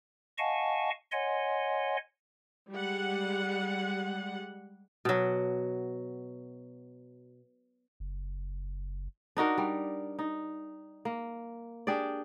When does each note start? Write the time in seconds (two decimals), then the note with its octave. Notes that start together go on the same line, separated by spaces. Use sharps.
0.38 D#5 F5 F#5 G#5 A5 C#6
1.12 C#5 D#5 F#5 G#5 C6
2.71 G3 G#3 F#5
5.05 B2 F#3
8.00 F#1
9.37 D4 D#4 F#4 A#4
9.58 G3
10.19 D#4
11.05 A#3
11.87 D4 G4 G#4 D5